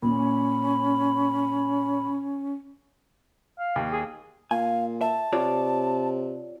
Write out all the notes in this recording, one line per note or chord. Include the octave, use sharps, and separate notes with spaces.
A#2 C#4 B5
F5
D#2
G#4
A#2 F5 G#5
E5 A5
C3 F4 C#5 D5